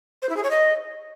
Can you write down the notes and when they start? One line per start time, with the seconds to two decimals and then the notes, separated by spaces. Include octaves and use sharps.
0.22 C5
0.29 E4
0.36 G#4
0.43 C#5
0.51 D#5